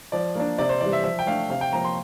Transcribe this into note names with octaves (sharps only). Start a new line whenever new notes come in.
F3 D5
A#3 D4
C3 D5
C5
E3 D5
G3
E5
F3 E5
G5
A3 D4 F5
C3 F5
G5
F3 A#3 A#5
C6